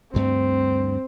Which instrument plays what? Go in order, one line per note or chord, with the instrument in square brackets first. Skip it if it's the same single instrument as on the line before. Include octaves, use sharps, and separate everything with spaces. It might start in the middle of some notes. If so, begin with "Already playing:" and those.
[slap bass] D2 G2 A3 [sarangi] C4